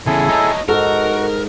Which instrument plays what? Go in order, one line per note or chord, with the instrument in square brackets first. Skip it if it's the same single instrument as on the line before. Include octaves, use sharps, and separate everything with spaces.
[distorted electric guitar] E2 C#3 [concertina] E4 G#4 A4
[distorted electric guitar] D#4 C#5 [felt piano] A5 A#5
[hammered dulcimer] G#2 [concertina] F#4 [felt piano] A4 [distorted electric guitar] A#4